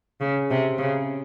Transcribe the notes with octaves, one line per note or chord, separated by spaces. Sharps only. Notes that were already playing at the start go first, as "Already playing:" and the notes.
C#3
C3
C#3